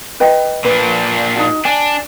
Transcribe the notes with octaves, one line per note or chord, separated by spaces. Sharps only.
B4 D#5 G5
A#2 D4 B4
D#4 F#4
D4 G#5